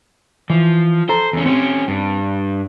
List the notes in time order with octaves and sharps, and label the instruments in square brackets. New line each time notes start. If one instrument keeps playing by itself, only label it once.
[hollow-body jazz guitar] E3 [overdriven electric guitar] F3
[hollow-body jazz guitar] A4 A#5 [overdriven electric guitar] C5
[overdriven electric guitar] E2 C#4
[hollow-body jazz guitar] C4 [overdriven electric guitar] C#4 G4
[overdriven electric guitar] G2